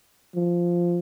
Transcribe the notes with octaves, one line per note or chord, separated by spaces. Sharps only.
F3